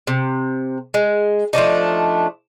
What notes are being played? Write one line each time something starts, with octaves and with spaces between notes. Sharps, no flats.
C3
G#3
F3 A3 D4 D#4